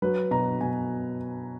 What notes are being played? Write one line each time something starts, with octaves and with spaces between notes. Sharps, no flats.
F#3 B4
B2 A#5
B2 G#5